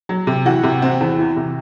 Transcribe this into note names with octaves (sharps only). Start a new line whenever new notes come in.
F#3
C3
E3 F#4 F#5
C3
C4
E2
E3
C3